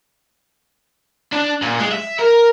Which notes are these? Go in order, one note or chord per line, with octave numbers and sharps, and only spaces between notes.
D4
A#2
G#3
E5
A#4